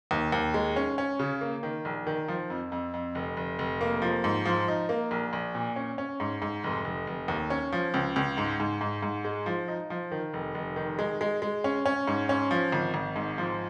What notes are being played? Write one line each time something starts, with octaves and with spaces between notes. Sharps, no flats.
D#2
D#2
G#3
C#4
C#4
C#3
A#3
D#3
A#1
D#3
F3
F2
F2
F2
F1
F1
F1
A#3
F3
G#2
F3
D#4
A#3
A#1
A#1
A#2
C#4
C#4
G#2
G#2
F1
F1
F1
D#2
C#4
F3
C#2
C#2
G#2
G#2
G#2
G#2
G#3
F3
D#4
F3
D#3
F1
F1
D#3
G#3
G#3
G#3
C#4
C#4
G#2
C#4
F3
G#1
G#1
G#2
F3